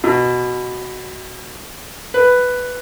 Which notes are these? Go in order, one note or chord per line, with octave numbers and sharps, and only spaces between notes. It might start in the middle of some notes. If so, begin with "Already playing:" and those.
B2
B4